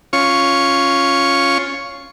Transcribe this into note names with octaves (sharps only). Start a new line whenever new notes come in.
C#4 F4 C#6